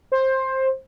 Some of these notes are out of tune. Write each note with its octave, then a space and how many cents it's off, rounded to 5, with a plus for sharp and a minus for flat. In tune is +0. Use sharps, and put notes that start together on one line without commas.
C5 +15